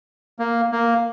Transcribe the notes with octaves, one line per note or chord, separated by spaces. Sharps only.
A#3
A#3